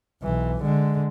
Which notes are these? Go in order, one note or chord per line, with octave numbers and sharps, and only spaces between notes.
B1 E3
D3 G#3